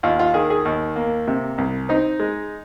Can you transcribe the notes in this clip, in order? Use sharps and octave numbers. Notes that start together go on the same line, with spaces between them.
D#2 F4
F4
D#3 G#4
G#4
D#2
A#3
C3
C2
C4 D#4
G#3